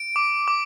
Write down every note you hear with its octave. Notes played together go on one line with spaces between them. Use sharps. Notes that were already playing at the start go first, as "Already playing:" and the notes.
Already playing: D7
D6
D6